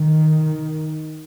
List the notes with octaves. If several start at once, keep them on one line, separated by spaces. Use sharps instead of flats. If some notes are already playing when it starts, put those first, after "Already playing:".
Already playing: D#3